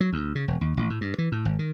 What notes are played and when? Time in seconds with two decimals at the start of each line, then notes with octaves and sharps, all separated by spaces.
0.01 F#3
0.13 D2
0.35 C#3
0.48 E1
0.61 D#2
0.77 A1
0.90 A2
1.01 G2
1.18 E3
1.32 A2
1.45 G#1
1.59 D#3